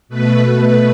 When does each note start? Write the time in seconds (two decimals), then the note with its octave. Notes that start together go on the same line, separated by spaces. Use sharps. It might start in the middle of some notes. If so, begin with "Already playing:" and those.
0.08 B2 A3 B4
0.40 B4